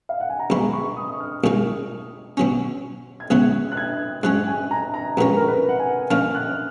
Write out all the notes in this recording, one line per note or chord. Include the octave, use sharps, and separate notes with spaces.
F5
F#5
G#5
A#5
B1 B2 G#3 B5
C#6
C#6
D#6
D#6
F6
B1 A#2 G#3 D#4
B2 F#3 C#4
G#6
C#2 B2 F#3 B3 F#6
F#6
G#6
G#2 F#3 C#4 F#6
G#5
A#5
A#5
A#1 A#2 G#3 C#4 B4
A#4
B4
F#5
G#5
A#2 F3 A#3 C#4 F6
F#6